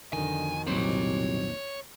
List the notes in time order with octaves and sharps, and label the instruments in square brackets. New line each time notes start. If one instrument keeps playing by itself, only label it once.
[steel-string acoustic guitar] F2 B2 D#3 [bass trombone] D3 [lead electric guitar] G#5
[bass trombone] C2 [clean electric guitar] A#2 F#3 C4 [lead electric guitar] C#5 C6